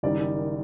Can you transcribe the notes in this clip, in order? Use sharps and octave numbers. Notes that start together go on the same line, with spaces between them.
F#1 F#2 D#3 G3 D5